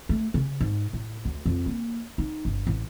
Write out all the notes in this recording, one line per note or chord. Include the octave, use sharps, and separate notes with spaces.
A3
C#3
G#2
A2
D2
F2
A#3
D#4
G1
A1